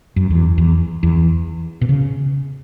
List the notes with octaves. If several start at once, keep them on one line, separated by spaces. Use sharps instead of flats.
F#2
E2
E2
E2
B2
C#3